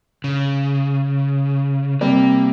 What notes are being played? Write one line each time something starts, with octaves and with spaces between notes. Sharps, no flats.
C#3
C3 G3 A#3